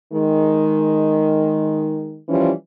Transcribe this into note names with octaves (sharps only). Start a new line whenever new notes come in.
D#3 G#3
E3 F3 G3 C#4